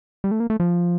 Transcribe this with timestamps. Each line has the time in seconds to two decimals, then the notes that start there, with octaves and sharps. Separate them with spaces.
0.24 G3
0.31 A3
0.40 A#3
0.50 A3
0.60 F3